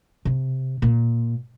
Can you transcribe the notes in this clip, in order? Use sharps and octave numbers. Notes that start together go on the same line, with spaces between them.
C3
A#2